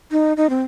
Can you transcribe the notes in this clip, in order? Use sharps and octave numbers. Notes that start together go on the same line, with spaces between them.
D#4
D#4
C4